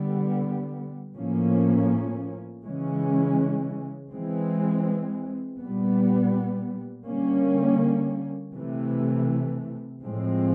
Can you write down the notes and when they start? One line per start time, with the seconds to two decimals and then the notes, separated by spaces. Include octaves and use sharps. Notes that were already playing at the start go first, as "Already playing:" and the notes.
Already playing: D3 G3 B3
1.16 A2 F3 A#3 C#4
2.63 C#3 E3 G#3 C#4
4.11 E3 G#3 C4
5.58 A#2 G3 B3
7.06 D3 G3 A#3 C#4
8.54 C3 E3 A3
10.02 A2 F3 G#3 C4